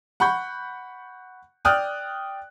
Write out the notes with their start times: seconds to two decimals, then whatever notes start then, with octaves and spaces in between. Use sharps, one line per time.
0.20 F#5 B5 C#6 G6
1.65 D5 G5 D#6 F6 F#6